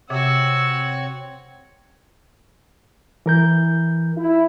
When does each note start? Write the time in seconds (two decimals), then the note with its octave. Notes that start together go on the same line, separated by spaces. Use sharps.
0.10 C3 C4 F#4 C#5 F#5 E6
3.26 E3 A#4 G6
4.17 E4